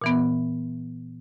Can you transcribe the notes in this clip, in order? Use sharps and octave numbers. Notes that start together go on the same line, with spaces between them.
A#2 E3 B3